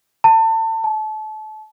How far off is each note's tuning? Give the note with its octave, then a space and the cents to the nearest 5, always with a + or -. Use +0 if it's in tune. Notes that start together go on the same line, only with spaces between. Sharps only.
A5 +30
A5 -30